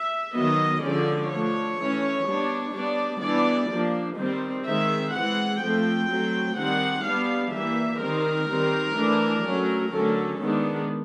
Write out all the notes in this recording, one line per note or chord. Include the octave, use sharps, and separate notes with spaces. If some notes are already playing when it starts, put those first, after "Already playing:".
Already playing: E5
D#3 F#3 B3 D#5
D3 F3 G#3 C#4 D5
F3 A3 D4 C#5
E3 A3 C#4
G3 B3 D4
G3 B3 D4 D5
E3 G3 B3 D4 D5
F3 A#3 D4
D#3 G3 C4
D#3 G#3 C4 E5
E3 G#3 C4 F#5
F3 A3 C4 G5
F#3 A3 C4
D#3 G3 C4 F#5
G3 B3 D4 F5
E3 G3 A#3 E5
D#3 G3 C4 A#4
D#3 G3 C4
E3 A3 D4
F#3 A3 C#4
D3 F#3 A3 C#4 A4
D#3 G#3 B3 D4